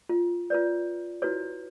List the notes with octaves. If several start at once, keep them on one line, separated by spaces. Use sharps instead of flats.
F4
F4 B4 D5
E4 F#4 B4 C#5